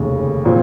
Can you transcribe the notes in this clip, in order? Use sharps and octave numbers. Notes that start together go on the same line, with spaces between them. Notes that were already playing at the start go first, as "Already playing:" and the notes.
Already playing: F1 D#2 C#3
A#2 F3 C4